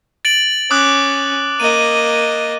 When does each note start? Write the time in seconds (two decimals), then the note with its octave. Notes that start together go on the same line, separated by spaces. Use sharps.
0.25 A6 D7 F#7
0.71 C#4 D6 D#6 F#6
1.60 A#3 D#5 D#7